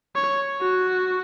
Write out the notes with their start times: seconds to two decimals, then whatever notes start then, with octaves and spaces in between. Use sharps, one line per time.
0.16 C#5
0.61 F#4